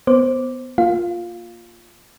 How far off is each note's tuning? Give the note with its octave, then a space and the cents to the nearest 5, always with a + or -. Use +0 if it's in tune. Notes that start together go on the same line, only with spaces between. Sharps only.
B3 +10 C5 +10 D6 -5
A#3 +0 F4 +5 F5 +5